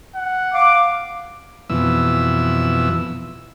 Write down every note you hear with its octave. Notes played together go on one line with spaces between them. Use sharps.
F#5
F5 D6
F2 B2 E3 E6